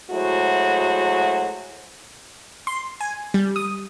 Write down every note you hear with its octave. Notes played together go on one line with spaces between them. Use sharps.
F#3 G#3 A3 E4 F#4 C5
C6
G#5
G3
D#6